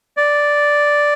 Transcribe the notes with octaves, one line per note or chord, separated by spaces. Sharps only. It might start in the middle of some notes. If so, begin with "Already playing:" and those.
D5